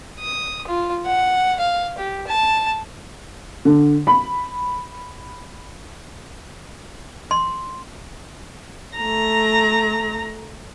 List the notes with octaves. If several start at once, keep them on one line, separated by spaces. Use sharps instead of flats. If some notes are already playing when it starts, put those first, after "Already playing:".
D#6
F4
F#5
F5
G4
A5
D3
B5
C6
A3 A#5